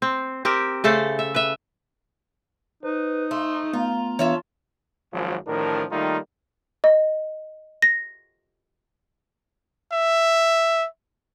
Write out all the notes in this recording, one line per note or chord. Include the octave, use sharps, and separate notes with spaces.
C4
C4 G4 A#4
C#3 A3 A4 C5
E5
B4 E5
D#4 B4 C5
A3 C6
A3 B3 F4 A#5
E3 B3 D4 F4 C#5 E5 A5
G#1 F#2 F3
A1 A2 D#3 F3 D4 A#4
D#3 G3 A3 A#3 D#4 F4
D#5
A#6
E5